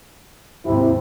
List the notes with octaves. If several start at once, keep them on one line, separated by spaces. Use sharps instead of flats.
D#2 G#2 C3 E4